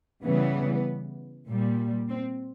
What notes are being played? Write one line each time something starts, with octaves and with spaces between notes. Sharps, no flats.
C#3 E3 G3 B3
A#2 G3
C4